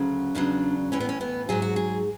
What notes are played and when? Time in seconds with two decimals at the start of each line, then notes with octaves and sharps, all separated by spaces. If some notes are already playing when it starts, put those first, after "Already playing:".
Already playing: D2 C#3 F#3
0.35 E2 C#3 F#3 D4
0.92 A2 E3 C#4
1.00 B3
1.09 C#4
1.21 B3
1.49 G#2 F#3 G#4
1.62 F#4
1.76 G#4